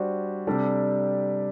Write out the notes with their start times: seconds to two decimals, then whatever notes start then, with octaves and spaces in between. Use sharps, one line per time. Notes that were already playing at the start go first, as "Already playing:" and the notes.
Already playing: G3 D4 F#4 C5
0.47 C3 G3 D4 A4